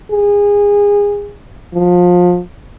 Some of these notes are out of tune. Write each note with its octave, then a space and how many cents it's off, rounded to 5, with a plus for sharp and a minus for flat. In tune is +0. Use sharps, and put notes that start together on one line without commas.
G#4 -25
F3 +25